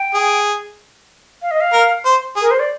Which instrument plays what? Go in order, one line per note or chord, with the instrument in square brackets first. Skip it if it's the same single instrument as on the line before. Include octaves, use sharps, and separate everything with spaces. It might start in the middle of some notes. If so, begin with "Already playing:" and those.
Already playing: [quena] G5
[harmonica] G#4
[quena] F5
D#5
F5
[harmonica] A#4
C5
G#4
[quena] A#4
C5
D5